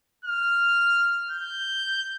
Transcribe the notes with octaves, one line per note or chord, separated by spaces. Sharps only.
F6
G6